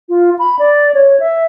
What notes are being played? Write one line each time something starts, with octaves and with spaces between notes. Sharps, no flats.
F4
B5
D5
C#5
E5